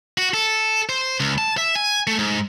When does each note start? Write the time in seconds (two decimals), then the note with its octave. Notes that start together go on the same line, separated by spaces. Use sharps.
0.18 F#4
0.34 A4
0.89 C5
1.20 C#2
1.38 A5
1.58 E5
1.75 G#5
2.07 A3
2.19 G#2